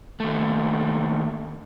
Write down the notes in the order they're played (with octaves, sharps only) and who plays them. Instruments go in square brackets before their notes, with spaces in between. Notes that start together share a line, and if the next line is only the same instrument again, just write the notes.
[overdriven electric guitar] D#2 A3